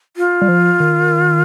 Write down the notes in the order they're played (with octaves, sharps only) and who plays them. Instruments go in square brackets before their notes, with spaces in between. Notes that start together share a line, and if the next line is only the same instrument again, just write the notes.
[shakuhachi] F4
[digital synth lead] G3
F3
D#3